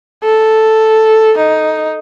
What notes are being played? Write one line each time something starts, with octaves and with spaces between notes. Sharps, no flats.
A4
D#4